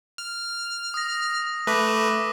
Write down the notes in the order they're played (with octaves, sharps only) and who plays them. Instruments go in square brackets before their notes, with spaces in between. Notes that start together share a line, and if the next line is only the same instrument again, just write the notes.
[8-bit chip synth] F6
[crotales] D#6 A#6
[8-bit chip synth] A3 B4 [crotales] D6 F#6 A#6
[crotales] E7